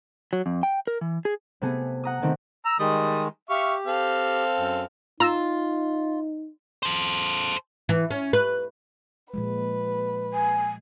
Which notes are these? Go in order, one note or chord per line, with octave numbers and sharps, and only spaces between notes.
F#3
F2
G5
A#4
E3
G#4
C3 A3 B3 G#4
F#5 A#5 D#6
C3 D#3 A3 C4
A#5 E6
D#3 G3 G#3 D#6
G4 E5 F5 C#6
C4 A4 F5
F#2
D#4 F4 A#5 E6
A4 C5
E3
C#4
B4
A#2 F3 G#3 B4
G#5